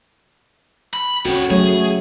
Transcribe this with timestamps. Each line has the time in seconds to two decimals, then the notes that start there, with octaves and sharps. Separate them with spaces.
0.93 B5
1.26 C#4 F#4 A4 G5
1.51 F#3 A3 G#4 C#5